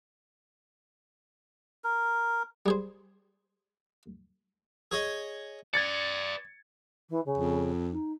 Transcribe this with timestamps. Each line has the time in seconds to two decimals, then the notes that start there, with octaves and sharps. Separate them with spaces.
1.84 A#4
2.66 G3 G#4 C5
4.91 G#4 C#5 D#5
5.74 B4 D5 G#6 A6 C#7
7.10 E3
7.26 C#3
7.38 F2
7.92 D#4